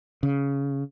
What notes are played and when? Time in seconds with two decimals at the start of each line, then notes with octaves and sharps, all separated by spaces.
0.23 C#3